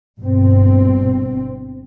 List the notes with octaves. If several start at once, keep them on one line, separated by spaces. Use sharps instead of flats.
G1 G2 B2 C4